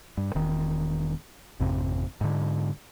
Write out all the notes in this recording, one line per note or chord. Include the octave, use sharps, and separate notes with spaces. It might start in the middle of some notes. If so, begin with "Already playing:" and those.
G2
E1 D#3
G#1 F2 C3
G#2 D3